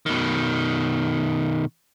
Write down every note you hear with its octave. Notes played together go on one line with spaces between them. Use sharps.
B2 D#3